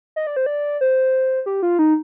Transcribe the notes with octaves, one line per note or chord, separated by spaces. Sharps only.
D#5
D5
C5
D5
C5
G4
F4
D#4